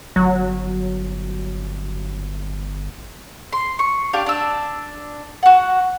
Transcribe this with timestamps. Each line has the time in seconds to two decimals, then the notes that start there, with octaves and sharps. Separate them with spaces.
0.16 G1 F#3
3.53 C6
3.79 C#6
4.13 D4 G4 F5
4.26 D4 E6
5.43 F#4 F#5